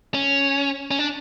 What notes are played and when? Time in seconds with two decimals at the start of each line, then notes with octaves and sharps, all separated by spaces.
0.14 C#4
0.91 C#4
0.99 D4